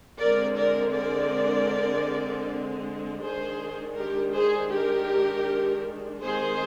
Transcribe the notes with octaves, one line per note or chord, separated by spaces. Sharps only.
D3 G#3 C4 A#4 D5
A#4 D5
A#4 D5
D#3 G#3 D4 G#4 C5
G4 A#4
G#4 C5
G4 A#4
D#3 G#3 C4 G#4 C5